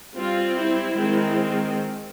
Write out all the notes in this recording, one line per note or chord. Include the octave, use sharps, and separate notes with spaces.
G3 C4 F4
E4
D#3 G#3 C4